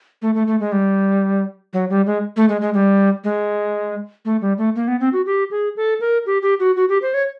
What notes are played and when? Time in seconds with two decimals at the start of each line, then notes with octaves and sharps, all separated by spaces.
0.22 A3
0.35 A3
0.47 A3
0.60 G#3
0.72 G3
1.73 F#3
1.90 G3
2.06 G#3
2.36 A3
2.49 G#3
2.61 G#3
2.74 G3
3.24 G#3
4.25 A3
4.41 G3
4.58 A3
4.76 A#3
4.88 B3
5.00 C4
5.13 F#4
5.26 G4
5.51 G#4
5.76 A4
6.00 A#4
6.26 G4
6.42 G4
6.60 F#4
6.76 F#4
6.89 G4
7.02 C5
7.14 C#5